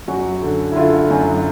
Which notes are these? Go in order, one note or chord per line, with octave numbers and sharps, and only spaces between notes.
F#2 F#4
D3
E4
D3 F4
F#2